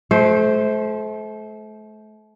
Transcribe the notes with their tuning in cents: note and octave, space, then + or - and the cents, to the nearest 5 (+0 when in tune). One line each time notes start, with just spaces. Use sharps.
A3 -35 C5 +0